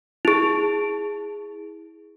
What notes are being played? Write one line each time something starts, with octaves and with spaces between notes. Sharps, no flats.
E4 G#4